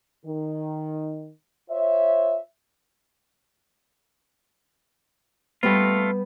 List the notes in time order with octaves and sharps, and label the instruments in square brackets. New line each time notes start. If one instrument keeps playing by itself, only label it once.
[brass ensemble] D#3
F4 C5 C#5 E5
[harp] G3 B3 [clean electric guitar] A3 F4